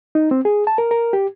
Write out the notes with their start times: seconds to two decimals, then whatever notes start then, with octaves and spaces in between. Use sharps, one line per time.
0.15 D#4
0.31 C4
0.45 G#4
0.67 A5
0.78 A#4
0.91 A#4
1.13 G4